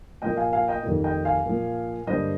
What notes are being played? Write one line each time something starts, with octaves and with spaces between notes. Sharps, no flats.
A#2 F3 A#3 D#5 G5
F5 G#5
F5 G#5
D#5 G5
F2 D#3 G3 A#3
D#5 G5
F5 G#5
A#2 F3 A#3
G2 D3 G3 A#3 C5 D#5